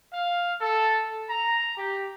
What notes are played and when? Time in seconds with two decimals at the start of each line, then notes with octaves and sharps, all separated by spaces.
0.12 F5
0.61 A4
1.29 A#5
1.77 G4